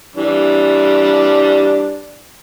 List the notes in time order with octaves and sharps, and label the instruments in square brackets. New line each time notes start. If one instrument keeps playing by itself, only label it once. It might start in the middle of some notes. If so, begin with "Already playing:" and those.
[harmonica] E3 G3 D4